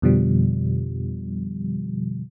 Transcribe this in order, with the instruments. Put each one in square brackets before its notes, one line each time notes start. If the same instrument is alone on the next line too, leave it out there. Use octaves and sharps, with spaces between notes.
[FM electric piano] F2 B2 D3 F3 G3